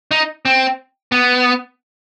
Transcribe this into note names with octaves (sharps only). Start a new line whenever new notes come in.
D#4
C4
B3